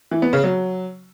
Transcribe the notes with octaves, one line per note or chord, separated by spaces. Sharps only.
E3
B3
C#3
F#3